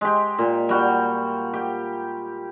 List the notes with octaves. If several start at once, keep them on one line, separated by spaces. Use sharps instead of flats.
G#3 G4
A#2
G3 F#4 G5
G4